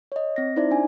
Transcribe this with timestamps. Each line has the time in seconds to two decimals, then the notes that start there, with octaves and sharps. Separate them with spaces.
0.12 C#5 D#5
0.36 C4 A#6
0.56 D#4 E4 C5 D5 E5
0.71 D4 G#5